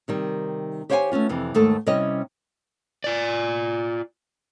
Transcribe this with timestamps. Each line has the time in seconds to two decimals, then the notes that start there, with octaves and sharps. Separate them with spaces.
0.08 C3 D#3 G3
0.90 G4 C5 C#5 F5 G5 G#5
1.12 A3 B3 C#4 F4
1.29 F2 C3 E3
1.54 D#2 G#2 A3 A4
1.86 C3 G3 C#4 E4 C#5 D#5
3.04 F4 D5